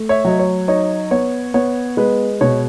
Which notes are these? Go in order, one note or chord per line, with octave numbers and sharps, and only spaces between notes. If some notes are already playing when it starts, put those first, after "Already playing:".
Already playing: A3
C#5 E5
F#3 D#5
C#5
D#4 C#5
B3 C#5
B3 C#5
G#3 B4
B2 C#5